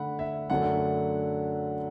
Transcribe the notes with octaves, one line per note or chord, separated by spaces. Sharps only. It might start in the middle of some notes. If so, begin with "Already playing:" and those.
Already playing: D3 A3 D4 F#5 B5
E5
F#2 D3 F#3 A3 D4 F#5